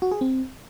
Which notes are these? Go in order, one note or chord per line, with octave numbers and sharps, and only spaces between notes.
F#4
G#4
C4